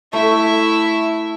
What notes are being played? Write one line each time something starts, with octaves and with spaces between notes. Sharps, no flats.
A3 E4 E5